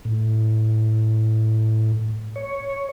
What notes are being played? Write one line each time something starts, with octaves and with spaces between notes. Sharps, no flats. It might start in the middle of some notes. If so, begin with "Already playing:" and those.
A2
C#5